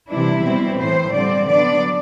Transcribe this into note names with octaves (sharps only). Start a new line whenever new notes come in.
C3 E3 G3 D4 E4
B2 G3 C4
A2 E3 A3 C5
D3 G3 C4 D5
D3 F#3 B3 D4 D5